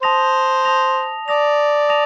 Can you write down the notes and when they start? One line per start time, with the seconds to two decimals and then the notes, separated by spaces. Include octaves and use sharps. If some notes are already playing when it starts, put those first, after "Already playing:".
0.02 C5 A5 D#6 A#6 F7
0.65 A5 D#6 A#6 F7
1.28 D5 A5 D#6 A#6 F7
1.89 A5 D#6 A#6 F7